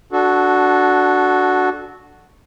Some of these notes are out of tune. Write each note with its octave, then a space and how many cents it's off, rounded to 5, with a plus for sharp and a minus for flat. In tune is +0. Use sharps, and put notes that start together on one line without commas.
D4 -5 F#4 +0 A4 -20